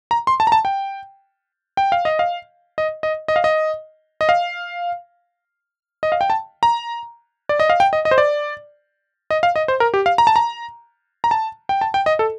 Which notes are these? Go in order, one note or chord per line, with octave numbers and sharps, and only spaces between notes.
A#5
C6
A5
A#5
A5
G5
G5
F5
D#5
F5
D#5
D#5
D#5
F5
D#5
D#5
F5
D#5
F5
G5
A5
A#5
D5
D#5
F5
G5
D#5
D#5
C5
D5
D#5
F5
D#5
C5
A#4
G4
F5
A#5
A5
A#5
A#5
A5
G5
A5
G5
D#5
A4